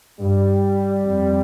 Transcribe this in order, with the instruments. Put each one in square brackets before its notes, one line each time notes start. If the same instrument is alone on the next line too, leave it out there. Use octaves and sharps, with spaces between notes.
[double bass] G2 [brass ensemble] G3
[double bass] F2